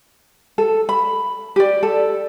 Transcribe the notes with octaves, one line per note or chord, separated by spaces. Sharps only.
A4
B5
G4 D5
A4